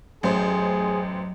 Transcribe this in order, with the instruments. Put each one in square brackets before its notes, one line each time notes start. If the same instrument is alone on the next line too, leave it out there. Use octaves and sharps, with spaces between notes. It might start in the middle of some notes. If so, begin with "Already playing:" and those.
[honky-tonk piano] A1 C5 [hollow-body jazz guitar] F#2 [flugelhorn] G#4